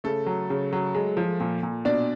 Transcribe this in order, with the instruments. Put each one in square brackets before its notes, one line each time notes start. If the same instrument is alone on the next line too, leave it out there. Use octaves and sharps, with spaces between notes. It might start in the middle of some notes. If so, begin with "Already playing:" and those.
[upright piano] C#3 A3 A4
F#3
C#3
F#3
G#3
F3
A#2
A#2
B2 D4 D5